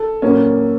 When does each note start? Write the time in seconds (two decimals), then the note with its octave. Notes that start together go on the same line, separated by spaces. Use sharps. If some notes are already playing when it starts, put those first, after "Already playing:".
Already playing: A4
0.22 A#2 F#3 A#3 C#4